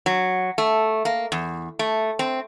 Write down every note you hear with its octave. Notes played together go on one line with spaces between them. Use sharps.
F#3
A3
A#3
E2
A3
C4